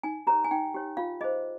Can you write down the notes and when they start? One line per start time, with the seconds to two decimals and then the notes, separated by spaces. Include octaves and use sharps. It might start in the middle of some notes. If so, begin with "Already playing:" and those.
0.03 D#4 G#5
0.27 G4 A#4 C#5 A#5
0.44 G#5
0.51 D#4 G5
0.74 G4 C#5
0.97 F4 F5
1.21 G#4 C5 D#5